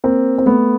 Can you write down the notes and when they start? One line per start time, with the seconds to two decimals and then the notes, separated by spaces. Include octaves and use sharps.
0.04 A#3 C4
0.38 C4
0.46 A3 B3